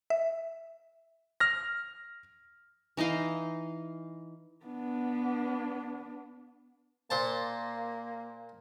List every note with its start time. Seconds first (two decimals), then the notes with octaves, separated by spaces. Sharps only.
0.10 E5
1.40 F6 A#6
2.97 E3 D#4 D#5 F5
4.66 B3 D4
7.10 A#2 A#3 C5 A5